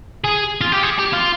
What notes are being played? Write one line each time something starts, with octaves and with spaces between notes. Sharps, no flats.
G#4
F4
G4
G#4
G4
F4